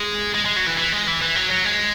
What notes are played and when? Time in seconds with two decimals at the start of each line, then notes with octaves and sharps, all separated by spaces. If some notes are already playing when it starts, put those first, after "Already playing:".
Already playing: G#3
0.35 G#3
0.46 G#3
0.56 F#3
0.67 E3
0.78 E3
0.93 G#3
1.08 E3
1.21 E3
1.36 F#3
1.51 F#3
1.65 G#3